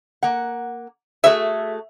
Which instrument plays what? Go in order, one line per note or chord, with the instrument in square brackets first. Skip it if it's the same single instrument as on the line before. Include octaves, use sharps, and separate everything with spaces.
[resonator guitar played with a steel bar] A#3 F#5
[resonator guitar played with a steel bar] A3 F#4 G#4 [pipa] E5